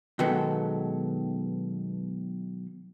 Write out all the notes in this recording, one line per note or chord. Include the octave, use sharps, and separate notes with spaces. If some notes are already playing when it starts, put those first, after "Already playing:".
B2 D#3 F#3 G#3 B3 A4